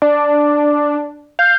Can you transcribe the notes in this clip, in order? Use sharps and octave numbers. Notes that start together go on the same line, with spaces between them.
D4 D5
F5 G6